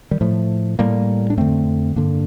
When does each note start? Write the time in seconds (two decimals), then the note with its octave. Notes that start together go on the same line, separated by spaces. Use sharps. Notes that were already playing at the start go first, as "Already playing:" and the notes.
0.11 D#3 G3
0.21 A2 F3 A3
0.79 A2 G3 A#3
1.30 D4
1.37 F2 D3 A3 C4
1.96 G2 D3 A#3 D4